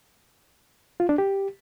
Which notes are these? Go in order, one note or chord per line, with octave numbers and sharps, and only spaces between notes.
F4
D4
G4